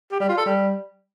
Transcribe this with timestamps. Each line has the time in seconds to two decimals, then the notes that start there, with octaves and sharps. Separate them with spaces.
0.12 G4
0.20 G3
0.29 F4
0.37 A4
0.46 G3